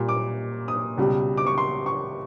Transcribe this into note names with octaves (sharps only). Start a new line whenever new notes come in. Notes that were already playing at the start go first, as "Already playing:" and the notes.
Already playing: A#2 G3
D6
D#6
C#2 B2 G3
D6
C#6
C6
C#6